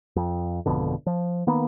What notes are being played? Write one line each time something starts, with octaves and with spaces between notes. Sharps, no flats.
F2
G#1 F2 B2 D3
F3
D#3 A#3 B3